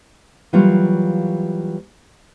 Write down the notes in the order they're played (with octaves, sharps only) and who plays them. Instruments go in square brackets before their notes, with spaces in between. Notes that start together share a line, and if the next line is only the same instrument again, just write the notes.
[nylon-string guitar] E3 F#3 G3 A#3 F4 C#5